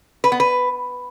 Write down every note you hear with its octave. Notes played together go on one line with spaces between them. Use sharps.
B4
B3
B4